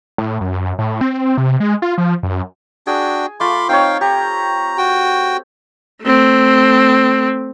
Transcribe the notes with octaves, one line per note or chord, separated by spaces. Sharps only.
A2
F#2
A2
C4
C3
G#3
F4
F3
F#2
D4 F#4 G#4 G5
A3 F4 B5 C6 D6
C4 D#4 C#5 F5 G5
G4 A#5
F#4 G5
A3 C4